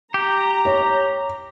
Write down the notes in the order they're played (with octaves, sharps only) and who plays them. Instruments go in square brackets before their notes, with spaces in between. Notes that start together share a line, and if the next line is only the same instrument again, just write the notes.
[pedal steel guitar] G4 [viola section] A#5
[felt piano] C#5